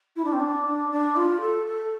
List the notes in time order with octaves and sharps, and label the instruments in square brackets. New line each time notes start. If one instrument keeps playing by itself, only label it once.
[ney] E4
D4
C4
D4
D4
D4
F4
A4
A4